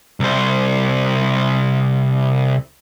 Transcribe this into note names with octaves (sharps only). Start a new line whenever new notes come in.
C2 C5